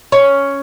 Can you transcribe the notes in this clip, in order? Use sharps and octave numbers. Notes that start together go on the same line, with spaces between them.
C#4